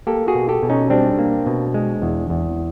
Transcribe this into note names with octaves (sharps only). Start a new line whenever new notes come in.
A#3 G4 A4
F#4 G#4
B2
G4 A4
B2
C#4 D#4
G3 C4 D4
A#3
B2
G#3
E2
E2